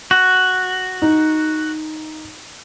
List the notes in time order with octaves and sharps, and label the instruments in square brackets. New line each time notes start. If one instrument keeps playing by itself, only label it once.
[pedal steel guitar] F#4
[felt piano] D#4